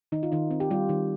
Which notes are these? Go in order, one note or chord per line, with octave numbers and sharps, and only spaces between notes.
D#3 D#4
F4
D#3 D#4
C4
G4
G3 F4
D#3